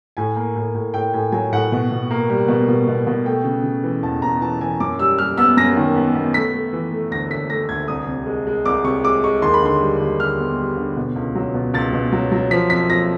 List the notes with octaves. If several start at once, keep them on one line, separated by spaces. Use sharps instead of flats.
A2 G#5
A#3
A2
A2
A2 G5
A2 G#5
F#3 G#5
A2 F#5
B2
B2
A#3
G3
B2
B2
B2
B2
A3 G5
C#3
C#3
E3
E2 A5
E2 A#5
E3 A5
E3 G#5
F#2 D6
G3 E6
G3 F6
B3 E6
F#2 A#6
D#3
B3
B3
A3 B6
A3
E3
A3
D2 A#6
D2 B6
A3 A#6
D2 G#6
C2 D#6
C3
G#3
G#3
C2 D6
C3 C#6
G#3 D6
G#3 C#6
D#2 C6
B5
D3 C6
G3
D#2
D3 F6
B3
G3
D3
B2
C#2
F#3
B2
C#2 A6
B2
F#3
F#3
F3 B6
F2 B6
F2 A#6